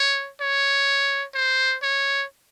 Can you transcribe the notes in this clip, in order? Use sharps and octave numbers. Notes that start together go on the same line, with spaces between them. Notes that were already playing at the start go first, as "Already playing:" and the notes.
Already playing: C#5
C#5
C5
C#5